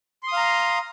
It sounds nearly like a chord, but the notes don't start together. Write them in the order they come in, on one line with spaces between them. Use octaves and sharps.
C6 D#6 F5 A#5